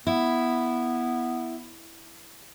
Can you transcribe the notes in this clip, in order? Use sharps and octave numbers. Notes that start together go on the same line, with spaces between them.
B3 E4